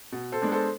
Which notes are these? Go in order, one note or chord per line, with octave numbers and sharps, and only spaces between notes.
B2
A4 C5
G#3 B3 D4
A4 C5